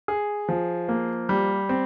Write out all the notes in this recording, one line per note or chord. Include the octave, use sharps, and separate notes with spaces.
G#4
F3
A#3
G3
C4